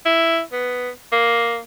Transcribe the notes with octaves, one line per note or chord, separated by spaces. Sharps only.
E4
B3
A#3